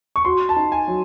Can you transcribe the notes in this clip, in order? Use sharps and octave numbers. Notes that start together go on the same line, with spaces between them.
C#6
F#4 C6
A5
D#4
G#5
F#3